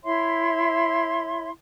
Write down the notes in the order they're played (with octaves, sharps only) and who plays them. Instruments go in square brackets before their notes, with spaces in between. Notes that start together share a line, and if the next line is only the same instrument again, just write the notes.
[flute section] E4 C#5 E5 C6